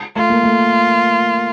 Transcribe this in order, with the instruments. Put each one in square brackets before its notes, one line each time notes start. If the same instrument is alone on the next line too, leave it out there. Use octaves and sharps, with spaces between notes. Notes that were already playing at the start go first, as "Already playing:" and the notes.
[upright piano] A3 [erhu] F4
[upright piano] A#3
A3